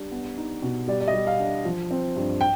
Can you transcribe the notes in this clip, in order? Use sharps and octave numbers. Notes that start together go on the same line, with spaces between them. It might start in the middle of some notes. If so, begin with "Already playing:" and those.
Already playing: G3 D4
B3
D#4
B2
G3 D5
D5
D#5
G3
F5
D4
F3
C4
G2
G5